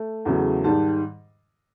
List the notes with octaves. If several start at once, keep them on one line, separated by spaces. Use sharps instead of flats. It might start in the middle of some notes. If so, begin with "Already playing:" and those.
Already playing: A3
E2 C#3 F#3 A3
G#2 D#3 G3 A5